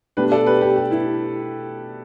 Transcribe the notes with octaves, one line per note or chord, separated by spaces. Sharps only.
B2 A3 D4 G4 B4
A4 D5
G4 B4
G4 B4
G4
E4